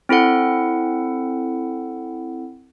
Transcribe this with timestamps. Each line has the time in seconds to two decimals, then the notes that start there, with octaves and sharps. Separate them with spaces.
0.09 C4 E4 A4 F#5